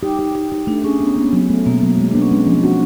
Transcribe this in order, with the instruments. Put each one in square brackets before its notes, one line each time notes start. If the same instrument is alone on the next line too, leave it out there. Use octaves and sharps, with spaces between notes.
[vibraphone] D#4 [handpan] G4
[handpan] G4
G4
G4
[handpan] A3 [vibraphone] D4
[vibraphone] C#4 [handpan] G#4
[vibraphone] B3 [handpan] C#4
[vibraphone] A#3 [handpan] C#4
[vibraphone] B3
[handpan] F#3
A3
[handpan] B2 [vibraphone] A#3
[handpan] F#3
G#3
[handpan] B3 [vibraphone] D4
[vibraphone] C#4
[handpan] G#3 [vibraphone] C4
[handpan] F3
F#4